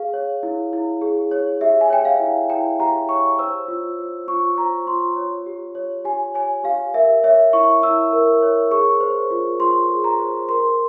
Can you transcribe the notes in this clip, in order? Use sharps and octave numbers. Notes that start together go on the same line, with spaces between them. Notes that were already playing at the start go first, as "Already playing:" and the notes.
Already playing: G#4 F5
C#5
E4
E4
G#4
C#5
G4 E5
G#5
C#5 G5
F5
E4
E4 G5
G4 A#5
C#5 C#6
C5 E6
F4
C5
F4 C#6
C5 A#5
F4 C6
C#5
G4
C#5
G4 G#5
C#5 G#5
G4 F5
A#4 E5
C#5 E5
E4 C#6
E4 E6
A#4
C#5
G#4 C#6
C5
F4
F4 C6
G#4
A#5
C5
A#4 C6